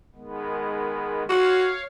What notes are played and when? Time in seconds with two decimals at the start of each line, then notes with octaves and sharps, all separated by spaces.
0.15 D#3 G#3 B3
1.30 F#4 C#5 F5